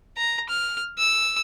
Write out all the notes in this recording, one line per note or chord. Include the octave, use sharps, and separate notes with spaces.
A#5
F6
E6